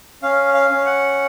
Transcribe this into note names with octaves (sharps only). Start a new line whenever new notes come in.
C#4 F5
F5
C#4
F#5